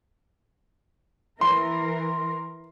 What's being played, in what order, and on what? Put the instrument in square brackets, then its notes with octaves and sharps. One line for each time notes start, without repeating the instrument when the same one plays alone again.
[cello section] E3 A#4 [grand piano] C6